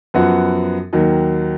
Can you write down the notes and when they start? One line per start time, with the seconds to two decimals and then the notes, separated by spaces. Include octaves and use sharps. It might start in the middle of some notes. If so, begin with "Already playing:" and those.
0.14 F#2 F3 B3 F#4
0.93 D#2 D#3 F#3